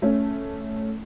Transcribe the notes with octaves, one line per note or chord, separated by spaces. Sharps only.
A3 C#4